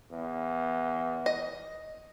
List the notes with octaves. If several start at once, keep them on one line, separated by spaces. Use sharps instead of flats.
E2
D#5